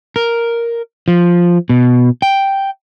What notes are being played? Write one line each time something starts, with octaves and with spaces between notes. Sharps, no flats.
A#4
F3
B2
G5